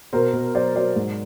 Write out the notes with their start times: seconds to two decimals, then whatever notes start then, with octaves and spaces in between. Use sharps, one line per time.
0.13 B2 A#4 C5
0.33 B2
0.54 F#3 C5 D5
0.75 F#3 C5 D5
0.96 G#2